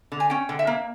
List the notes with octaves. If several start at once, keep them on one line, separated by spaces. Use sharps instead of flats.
D3
G#5
C#4 G5
D3
E5
A#3